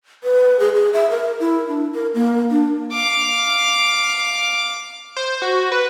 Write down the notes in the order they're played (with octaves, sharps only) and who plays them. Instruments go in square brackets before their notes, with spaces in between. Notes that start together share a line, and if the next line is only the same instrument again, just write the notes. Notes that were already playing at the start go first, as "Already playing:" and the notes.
[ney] B4
G#4
G#4
E5
A#4
E4
D4
A#4
A#3
D4
[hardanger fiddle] F5 D6
[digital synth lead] C5
F#4
B4